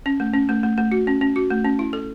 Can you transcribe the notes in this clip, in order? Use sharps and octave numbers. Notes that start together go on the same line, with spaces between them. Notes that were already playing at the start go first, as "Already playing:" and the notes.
C#4
A3
C#4
A3
A3
A3
F#4
C#4
C#4
F#4
A3
C#4
E4
A4